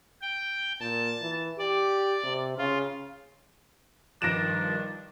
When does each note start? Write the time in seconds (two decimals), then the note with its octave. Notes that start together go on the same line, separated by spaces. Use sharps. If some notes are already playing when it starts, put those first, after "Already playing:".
0.21 G5
0.80 A#2 A5
1.21 E3
1.58 G4 D5
2.24 C3
2.58 C#3 F4
4.22 G2 D#3 F3 D4 A#6 D7 E7